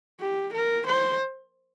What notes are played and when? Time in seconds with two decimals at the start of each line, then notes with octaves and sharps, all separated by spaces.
0.20 G4
0.53 A#4
0.86 C5